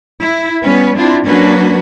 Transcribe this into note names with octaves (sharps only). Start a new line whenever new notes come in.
E4
G3 B3 C#4 B4
C4 D4 E4 F4
F#3 A#3 C#4 D4 F#4 B4